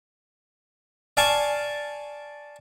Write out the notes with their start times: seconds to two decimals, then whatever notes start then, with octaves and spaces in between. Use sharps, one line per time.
1.17 D5 F5 G#5 A5 C#6